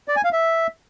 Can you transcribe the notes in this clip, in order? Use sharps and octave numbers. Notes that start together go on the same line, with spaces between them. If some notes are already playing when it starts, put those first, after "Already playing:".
D5
G#5
F5
E5